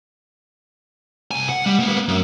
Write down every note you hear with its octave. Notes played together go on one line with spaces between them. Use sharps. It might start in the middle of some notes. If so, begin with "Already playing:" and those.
C2 G#5
F#5
G3
A#3 B3
F#2